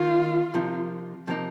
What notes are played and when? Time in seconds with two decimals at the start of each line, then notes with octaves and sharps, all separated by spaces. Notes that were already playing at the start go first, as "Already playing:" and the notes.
Already playing: D#3 A#3 D#4 F4
0.54 C3 F3 A#3 D#4
1.27 C3 F3 A#3 D#4